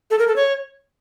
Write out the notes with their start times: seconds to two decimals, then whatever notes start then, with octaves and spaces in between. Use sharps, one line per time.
0.11 A4
0.19 A#4
0.28 A4
0.36 C#5